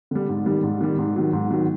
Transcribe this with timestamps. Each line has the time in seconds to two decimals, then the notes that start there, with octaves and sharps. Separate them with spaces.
0.11 D3 G3
0.29 G#2
0.46 D#3 G3
0.63 G#2
0.81 D#3 G3
0.98 G#2
1.16 D#3 F#3
1.33 G#2
1.51 D#3 F#3